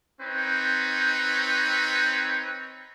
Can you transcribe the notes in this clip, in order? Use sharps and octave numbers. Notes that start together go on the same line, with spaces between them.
C4 D#4 B4 C#5